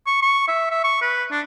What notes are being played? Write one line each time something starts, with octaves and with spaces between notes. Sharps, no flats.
C#6
C#6
E5
E5
C#6
B4
D4